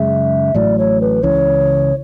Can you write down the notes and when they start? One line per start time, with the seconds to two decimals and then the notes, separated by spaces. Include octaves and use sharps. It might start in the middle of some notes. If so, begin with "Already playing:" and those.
Already playing: F#2 C#3 G#3 E5
0.54 A1 A2 F#3 D5
0.78 C#5
1.01 B4
1.23 C#2 C#3 E3 C#5